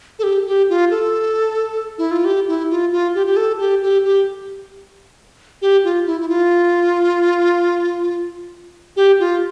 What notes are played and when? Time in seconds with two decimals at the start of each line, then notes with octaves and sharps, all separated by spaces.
0.19 A4
0.23 G4
0.47 G4
0.69 F4
0.91 A4
1.98 E4
2.11 F4
2.25 G4
2.48 E4
2.70 F4
2.92 F4
3.15 G4
3.27 G4
3.37 A4
3.59 G4
3.82 G4
4.04 G4
5.62 G4
5.84 F4
6.06 E4
6.21 E4
6.29 F4
8.96 G4
9.20 F4